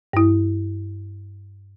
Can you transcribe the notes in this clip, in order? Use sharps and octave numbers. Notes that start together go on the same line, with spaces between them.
G2 E4